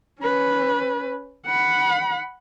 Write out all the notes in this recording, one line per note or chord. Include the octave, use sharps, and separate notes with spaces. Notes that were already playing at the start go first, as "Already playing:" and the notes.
C#4 B4
F#5 B5